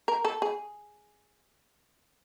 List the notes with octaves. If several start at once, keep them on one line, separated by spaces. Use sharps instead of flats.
A#4
A4
G#4